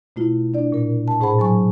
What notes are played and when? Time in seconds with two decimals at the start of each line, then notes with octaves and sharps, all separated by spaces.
0.16 B2 A3 E4 F4
0.54 D4 D5
0.72 A#2 A#4
1.08 A5
1.21 A2 G#4 C5 F#5 B5
1.39 F#3 G#5 C#6